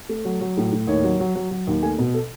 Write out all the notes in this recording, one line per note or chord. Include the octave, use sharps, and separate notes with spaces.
A3
F#3
F#3
A2
A2
D#2 C#5
F#3
F#3
F#3
F#3
D#2
A3 G#5
B2
A4